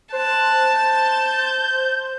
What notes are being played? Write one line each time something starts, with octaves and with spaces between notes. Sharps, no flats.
C5 A5 F#6
G6